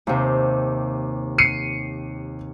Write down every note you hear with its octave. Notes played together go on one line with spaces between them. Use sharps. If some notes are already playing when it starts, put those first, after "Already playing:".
D#2 C3
C7 C#7 D#7